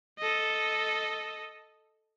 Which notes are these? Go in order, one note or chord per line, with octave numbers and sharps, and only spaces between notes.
A4 D#5